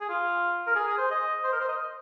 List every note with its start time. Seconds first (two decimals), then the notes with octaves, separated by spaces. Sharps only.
0.01 G#4
0.09 F4
0.67 A#4
0.76 G#4
0.88 G#4
0.98 C5
1.11 D#5
1.44 C5
1.53 A#4
1.60 C5
1.69 D#5